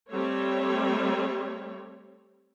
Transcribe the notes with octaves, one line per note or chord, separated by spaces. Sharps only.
G3 A3 C4 C#5